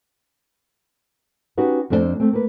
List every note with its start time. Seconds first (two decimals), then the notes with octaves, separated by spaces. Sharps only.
1.57 C#4 D#4 F#4 G4 B4
1.90 F2 A3 D4 G4 C5
2.20 A3 C4
2.33 A#3 B4